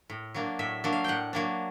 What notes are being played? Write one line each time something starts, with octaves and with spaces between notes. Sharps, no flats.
A2
F#3 A#3 D4
A2 E5
F#3 A#3 D4
F5
A2 F#5 G5
F#3 A#3 D4